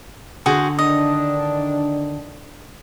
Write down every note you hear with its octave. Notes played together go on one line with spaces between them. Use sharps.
D3 F#4 G#4 C5
D#3 D4 D#5